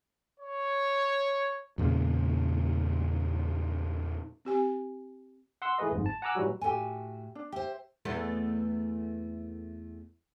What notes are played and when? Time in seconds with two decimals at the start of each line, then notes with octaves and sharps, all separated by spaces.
0.39 C#5
1.78 E2 A#2 C#3 G#3
4.45 C4 G4 G#5
5.62 F#5 C6 E6
5.78 E3 A3 G#4 B4 D#5
5.91 G1 F2 G#2
6.06 A5
6.22 F#5 G#5 A#5 D6 E6 F#6
6.35 A2 E3 F#3 G3 F#4
6.61 A2 F#4 G4 A4 G#5
7.35 D4
7.52 G4 C5 E5
8.05 E2 A3 B3